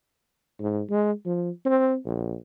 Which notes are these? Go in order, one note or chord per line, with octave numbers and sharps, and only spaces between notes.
G#2
G#3
F3
C4
A#1